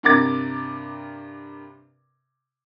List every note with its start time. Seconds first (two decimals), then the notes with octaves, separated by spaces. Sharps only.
0.03 G2 C3 A#4 D6 A6